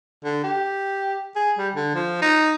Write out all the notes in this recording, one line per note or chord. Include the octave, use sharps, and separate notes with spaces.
D3
G4
G#4
G3
D3
F3
D#4